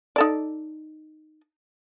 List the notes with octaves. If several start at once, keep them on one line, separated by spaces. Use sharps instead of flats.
D#4 A4 D5